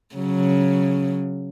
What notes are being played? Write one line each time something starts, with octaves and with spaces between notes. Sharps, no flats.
C#3 F#3